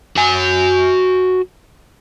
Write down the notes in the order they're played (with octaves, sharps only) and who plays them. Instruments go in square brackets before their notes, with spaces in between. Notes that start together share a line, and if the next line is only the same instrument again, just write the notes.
[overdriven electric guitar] F#4 G#5